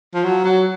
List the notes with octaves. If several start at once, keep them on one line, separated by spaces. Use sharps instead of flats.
F3
F#3
F#3